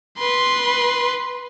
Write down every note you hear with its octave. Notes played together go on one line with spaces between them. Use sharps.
B4 C6